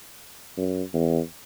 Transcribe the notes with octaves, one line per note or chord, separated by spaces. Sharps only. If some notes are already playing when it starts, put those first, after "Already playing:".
F#2
E2